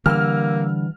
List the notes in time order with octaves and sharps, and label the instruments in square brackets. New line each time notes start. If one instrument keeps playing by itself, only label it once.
[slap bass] D3 G3 [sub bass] E3 [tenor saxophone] A#3 [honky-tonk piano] E6 F6